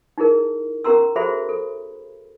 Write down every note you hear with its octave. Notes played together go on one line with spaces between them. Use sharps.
D#4 E4 G#4 A#4
C#4 G4 A#4 A#5 C6 E6
F#4 G#4 A4 C5 E5 B5
A4